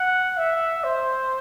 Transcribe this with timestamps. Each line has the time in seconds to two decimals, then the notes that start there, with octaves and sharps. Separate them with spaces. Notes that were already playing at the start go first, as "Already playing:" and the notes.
Already playing: F#5
0.37 E5
0.84 C5